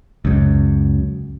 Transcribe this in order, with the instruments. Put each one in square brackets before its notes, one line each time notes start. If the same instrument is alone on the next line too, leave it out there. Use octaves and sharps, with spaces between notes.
[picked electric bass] C#2 F#2